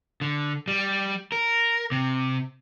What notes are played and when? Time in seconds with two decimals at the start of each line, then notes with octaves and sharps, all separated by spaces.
0.21 D3
0.68 G3
1.32 A#4
1.91 C3